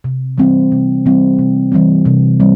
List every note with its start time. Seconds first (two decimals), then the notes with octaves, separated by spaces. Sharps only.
0.04 C3
0.38 E3 G3 C4
0.72 C3
1.06 E3 G3 C4
1.39 C3
1.72 E3 G3 C4
2.06 C3
2.40 E3 G3 C4